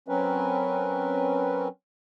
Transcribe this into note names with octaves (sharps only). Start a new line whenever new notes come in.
F#3 C4 C#4 A#4 B4